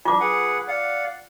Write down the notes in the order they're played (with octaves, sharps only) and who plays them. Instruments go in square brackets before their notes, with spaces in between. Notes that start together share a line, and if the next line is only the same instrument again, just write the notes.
[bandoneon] D4 [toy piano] F4 D6
[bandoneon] G#4 B4 F#5
D5 F5 F#5